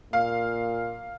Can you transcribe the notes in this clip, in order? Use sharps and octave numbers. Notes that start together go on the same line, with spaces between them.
A#2 F5